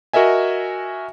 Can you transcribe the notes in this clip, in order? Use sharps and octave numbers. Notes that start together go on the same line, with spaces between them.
F#4 A#4 D#5 E5 G#5